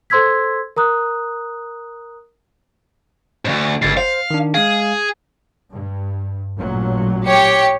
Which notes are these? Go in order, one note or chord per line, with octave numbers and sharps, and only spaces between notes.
A4 C5 C6 E6 G#6 B6
A#4 A#5 D#6 F#6
D2 G#2
G1 C#2 A6 C7
C5 F5
D#3 D4
G#3 G#4 F5
G2
A1 A#2 F#3
G4 C#5 C#7